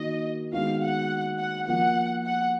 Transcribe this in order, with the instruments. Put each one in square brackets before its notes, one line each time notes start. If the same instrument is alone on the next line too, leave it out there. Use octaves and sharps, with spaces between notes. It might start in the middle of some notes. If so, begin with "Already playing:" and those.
Already playing: [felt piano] D#3 A#3 D#4 F#4 [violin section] D#5
[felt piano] D#3 G#3 B3 F#4 [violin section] F5
[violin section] F#5
F#5
[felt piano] F3 A#3 F4 [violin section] F#5
[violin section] F#5